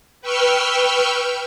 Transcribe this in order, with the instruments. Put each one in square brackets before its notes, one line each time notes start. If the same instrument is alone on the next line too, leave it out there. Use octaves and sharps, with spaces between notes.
[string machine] B4 G5 C#6 E6 F6 G6